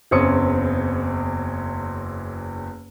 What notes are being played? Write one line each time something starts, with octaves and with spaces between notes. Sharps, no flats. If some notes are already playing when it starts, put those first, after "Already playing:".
F#1 E2 C4 C#4 D#6 C#7